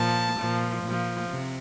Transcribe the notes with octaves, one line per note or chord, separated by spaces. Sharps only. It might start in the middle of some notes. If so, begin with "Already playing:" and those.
Already playing: A#2 F3 A5
A#2 F3
A#2 F3
C3